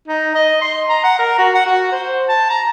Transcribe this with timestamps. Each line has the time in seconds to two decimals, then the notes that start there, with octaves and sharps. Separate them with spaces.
0.08 D#4
0.35 D#5
0.61 C6
0.89 A#5
1.04 F#5
1.19 A#4
1.38 F#4
1.54 F#5
1.66 F#4
1.92 C5
2.29 A5
2.50 A#5